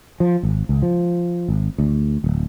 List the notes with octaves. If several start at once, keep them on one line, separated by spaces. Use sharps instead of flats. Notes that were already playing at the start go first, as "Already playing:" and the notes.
F3
G#1
C#2
F3
G#1
D2
D1